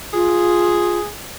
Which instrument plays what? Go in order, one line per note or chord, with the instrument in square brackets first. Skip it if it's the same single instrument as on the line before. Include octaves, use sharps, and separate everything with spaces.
[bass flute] F4 [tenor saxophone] G#4